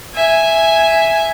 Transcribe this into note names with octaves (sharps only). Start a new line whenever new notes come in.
E5 G#5